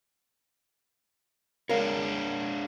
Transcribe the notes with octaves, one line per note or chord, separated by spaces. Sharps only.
G#3 D4 A#4 C#5 F5